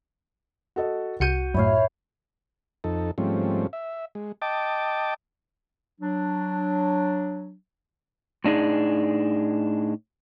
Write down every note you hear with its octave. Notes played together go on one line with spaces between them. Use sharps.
F#4 A4 D#5
C2 F#4 G6 C#7 D#7
F#2 A2 E4 C#5 F5
F2 D#4 A4
G#2 F3 G3 A3 C4 C#4
E5
G#3
D#5 G5 A5 D6
F#3 D4
A2 D4 D#4 G#4